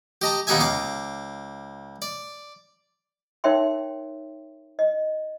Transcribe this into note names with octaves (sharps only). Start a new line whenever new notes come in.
G4 D#5 A5 A#5
D#2 B3 D#4 G4 E5 G#5
C#2 F5 D6
D5
D#4 A#4 C#5 E5 G5 C6
D#5